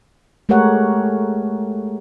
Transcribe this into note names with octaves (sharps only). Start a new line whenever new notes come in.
G#3 A3 G4 A#4 C#5 F#5